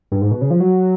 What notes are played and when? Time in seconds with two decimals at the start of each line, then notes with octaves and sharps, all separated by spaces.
0.12 G2
0.21 G#2
0.31 B2
0.41 C#3
0.51 F3
0.60 F#3